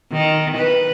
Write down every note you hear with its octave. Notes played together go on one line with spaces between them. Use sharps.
D#3
B4